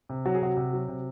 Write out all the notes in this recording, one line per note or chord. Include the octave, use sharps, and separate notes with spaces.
C3
F#3 F#4
G#4
C3 F#4
C3
F#3
C3